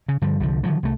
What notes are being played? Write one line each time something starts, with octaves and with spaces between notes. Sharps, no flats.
C#3
G2 D3 F3
C2 D3 F3
D3 D#3 F3 F#3
C2 A3